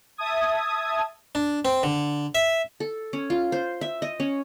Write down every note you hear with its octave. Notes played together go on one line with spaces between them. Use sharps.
E5 A5 D#6 G#6
D4
C4
D3
E5
A4
C#4
F4
C5
E5
D#5
C#4